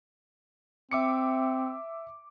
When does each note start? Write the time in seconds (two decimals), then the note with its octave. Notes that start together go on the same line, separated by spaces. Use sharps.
0.91 C4 E5 D6 C#7